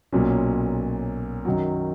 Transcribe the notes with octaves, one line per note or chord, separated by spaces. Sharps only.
B1 A#2 F#3 C#4
F#2 D#3 F#3